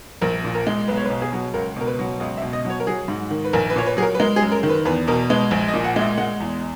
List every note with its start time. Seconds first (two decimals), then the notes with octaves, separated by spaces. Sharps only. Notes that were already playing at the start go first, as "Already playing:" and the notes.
0.21 A#1 A#4
0.44 A#2
0.55 A#4
0.67 G#3
0.87 B1 B4
0.97 C#5
1.05 B4
1.10 B2
1.22 G#4
1.33 F#3
1.54 C#2 A#4
1.76 B2 A#4
1.87 B4
1.99 F#3
2.20 C#2 D#5
2.37 E5
2.42 B2
2.53 D#5
2.65 F#3
2.70 C#5
2.80 A#4
2.87 F#3 G#4
3.08 G#2
3.31 D#3
3.44 B4
3.53 A#1 A#4
3.70 B4
3.76 A#2 C#5
3.86 B4
3.97 F#3 G#4
4.02 A#4
4.15 B4
4.20 G#3 A#4
4.36 G#4
4.42 F#2
4.52 A#4
4.63 D#3
4.69 B4
4.85 E2 B4
5.08 B2 A#4
5.30 G#3 B4
5.51 A#1
5.68 D#5
5.73 A#2
5.84 F#5
5.96 G#3 E5
6.17 G#3 F#5
6.40 E2